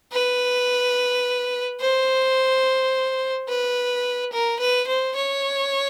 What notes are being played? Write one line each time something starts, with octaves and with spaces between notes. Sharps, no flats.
B4
C5
B4
A#4
B4
C5
C#5